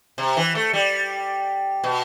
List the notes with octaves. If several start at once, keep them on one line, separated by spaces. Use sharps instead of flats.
C3
E3
A3
G3
B2